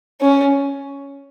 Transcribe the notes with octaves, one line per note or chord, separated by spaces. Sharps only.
C#4